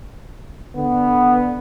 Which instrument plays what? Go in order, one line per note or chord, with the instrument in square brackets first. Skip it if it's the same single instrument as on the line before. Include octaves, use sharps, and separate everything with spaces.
[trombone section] D3 B3